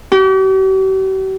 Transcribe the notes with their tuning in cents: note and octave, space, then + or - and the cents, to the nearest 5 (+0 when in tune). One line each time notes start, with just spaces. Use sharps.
G4 -45